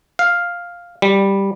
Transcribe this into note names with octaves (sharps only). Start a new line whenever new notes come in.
F5
G3